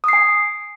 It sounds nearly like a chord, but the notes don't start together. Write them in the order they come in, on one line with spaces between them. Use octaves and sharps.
D#6 C7 G#5